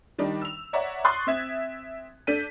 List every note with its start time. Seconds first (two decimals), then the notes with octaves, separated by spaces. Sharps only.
0.19 D#3 G3 D4 D#4
0.41 E6 F7
0.73 C#5 D5 E5 F#5 A#5
1.04 C6 C#6 D#6 F#6 A6
1.27 C4 E5 G#6
2.27 D4 A4 G6 B6 D#7